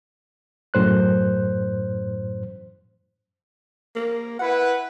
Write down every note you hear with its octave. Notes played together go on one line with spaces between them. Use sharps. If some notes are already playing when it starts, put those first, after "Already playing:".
F#2 A2 C5 F#6
A#3
E4 B4 F#5